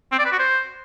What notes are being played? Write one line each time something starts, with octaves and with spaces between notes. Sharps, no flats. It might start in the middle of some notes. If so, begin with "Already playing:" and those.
C4
D5
B4
F#4
C5